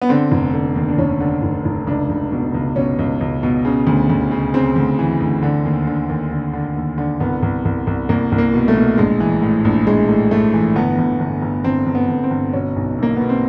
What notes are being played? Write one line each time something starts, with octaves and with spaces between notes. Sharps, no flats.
B3
D3 C4
F1
D3
D#2
D4
F1 C#4
D3
F1
F1
C#2 D4
C#2
B2
C#2
B2 C#4
C#2
C#2
B2
C#3
D2
D2
C#3
C#3 C4
D2
E3
D2
D3
D#2
D3
D#2
D3
D3
D#2
D3
C2 B3
C2
C2
C2
C2 A#3
C2
A#3
B2
A3
B2
A#1 G#3
E3
A2
A#1
A#1 G#3
A2
A2 A3
E3
G1 B3
G1
G1
G1
G1 C4
G1
B3
G1
C4
G1
B2 C#4
B1
B1 A#3
B2 B3
C4